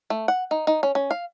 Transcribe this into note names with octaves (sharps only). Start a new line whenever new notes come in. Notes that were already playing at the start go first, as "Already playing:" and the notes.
A3
F#5
D#4
D#4
C#4
C#4
F5